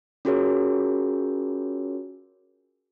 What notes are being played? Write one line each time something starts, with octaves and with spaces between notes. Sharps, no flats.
C#4 F4 F#4 G#4 A#4 C#5